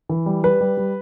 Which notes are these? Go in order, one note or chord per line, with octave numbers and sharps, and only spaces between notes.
E3
G3
G3 B4
G3
G3